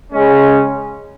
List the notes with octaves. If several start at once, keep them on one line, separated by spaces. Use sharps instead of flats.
C#3 G#3 C#4